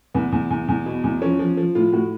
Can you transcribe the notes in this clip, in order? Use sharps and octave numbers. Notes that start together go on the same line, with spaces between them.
E2 B3
E2
E2
E2
B2
E2
F3 C#4
F3
F3
A2 F4
A2 F#4